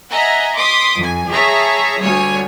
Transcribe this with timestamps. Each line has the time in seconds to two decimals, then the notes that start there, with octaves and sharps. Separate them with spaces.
0.12 D#5 E5 F#5 G#5 A#5
0.55 C6 D6 D#6 B6
0.97 F2 G#5
1.29 G#4 C#5 E5 A5 A#5
2.02 D2 G3 C#5 G#5